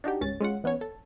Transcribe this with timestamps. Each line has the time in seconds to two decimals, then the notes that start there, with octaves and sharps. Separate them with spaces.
0.04 D4 D#4 F#4 G4
0.21 G#1 C#2 C#4 A6
0.41 G#3 C#4 F4 F#5
0.64 E3 B3 C#4 C#5
0.81 A4